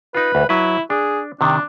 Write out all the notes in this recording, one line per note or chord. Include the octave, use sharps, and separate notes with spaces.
D#4 F4 B4
D2
F#3 E4 B4
D4 G#4
C3 D#3 D4